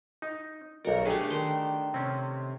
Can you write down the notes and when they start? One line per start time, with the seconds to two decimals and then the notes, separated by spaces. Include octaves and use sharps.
0.22 D#4
0.85 B1 F#4 A#4 D5
1.05 A3 D4 G4 G#4 B4
1.30 D#3 C6
1.94 C3 C4 C#4